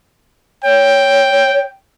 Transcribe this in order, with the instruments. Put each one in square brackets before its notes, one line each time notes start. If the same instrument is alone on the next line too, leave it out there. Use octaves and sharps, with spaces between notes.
[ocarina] C#5 [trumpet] G5